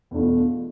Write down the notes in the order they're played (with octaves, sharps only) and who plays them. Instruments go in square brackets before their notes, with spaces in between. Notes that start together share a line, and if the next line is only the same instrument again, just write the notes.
[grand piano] E2 B2 A3 D4 F4